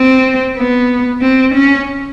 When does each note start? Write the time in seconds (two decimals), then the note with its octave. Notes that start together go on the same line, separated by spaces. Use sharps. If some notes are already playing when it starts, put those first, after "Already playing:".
Already playing: C4
0.58 B3
1.22 C4
1.54 C#4